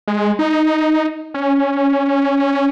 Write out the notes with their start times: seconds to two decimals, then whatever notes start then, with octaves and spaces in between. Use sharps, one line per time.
0.08 G#3
0.39 D#4
1.34 C#4